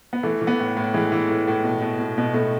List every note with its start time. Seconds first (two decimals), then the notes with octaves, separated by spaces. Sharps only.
0.13 B3
0.23 E3 A3
0.41 E3
0.47 B3
0.59 A2
0.77 A2
0.94 E3 G#3
1.12 E3
1.29 A2
1.47 A2
1.64 B2
1.81 B2
1.99 B2
2.18 B2
2.34 B2 A3